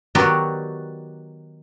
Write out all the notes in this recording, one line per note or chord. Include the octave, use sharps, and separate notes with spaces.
D#3 F#3 B3 F#4 G4 D5